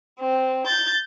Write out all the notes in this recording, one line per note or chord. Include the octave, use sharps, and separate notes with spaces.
C4
G6 A6